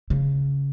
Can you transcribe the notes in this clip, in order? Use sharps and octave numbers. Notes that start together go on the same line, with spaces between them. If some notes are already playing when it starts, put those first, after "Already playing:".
C#3